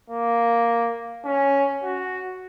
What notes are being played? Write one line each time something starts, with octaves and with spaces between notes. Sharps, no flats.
A#3
C#4
F#4